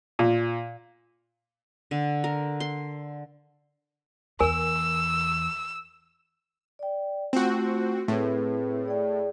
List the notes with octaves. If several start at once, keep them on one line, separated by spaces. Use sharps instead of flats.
A#2
D3
A#4
C6
E2 A#4 G#5 E6
D5 G5
A3 C4 F4 F#4
A2 C4 G#4 B4
G#4 D5 G5